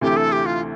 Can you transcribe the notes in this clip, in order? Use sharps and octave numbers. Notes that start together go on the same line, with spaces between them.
D2 C3 E3 A3 C4 G4
A4
G4
F4